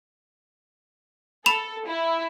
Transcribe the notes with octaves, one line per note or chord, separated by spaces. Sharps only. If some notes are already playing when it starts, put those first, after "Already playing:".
A4 B5 E7 F7
E4